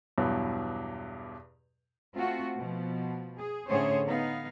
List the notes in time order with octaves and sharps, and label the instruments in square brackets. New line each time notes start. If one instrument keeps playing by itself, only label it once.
[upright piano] E2 G2 B2 F#3
[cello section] A3 C4 F4 F#4
B2 F3
G#4
A2 D3 C#4 G#4 C5 C#5
B3 D#4 F5